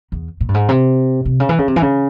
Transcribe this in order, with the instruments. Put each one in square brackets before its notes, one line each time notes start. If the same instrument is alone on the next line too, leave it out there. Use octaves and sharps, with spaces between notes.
[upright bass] E2
A#2
G2
G#2
C3
C3
C#3
E3
C#3
C3
E3
C#3